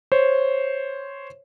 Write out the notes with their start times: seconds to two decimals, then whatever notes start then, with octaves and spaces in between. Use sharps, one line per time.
0.12 C5 C#5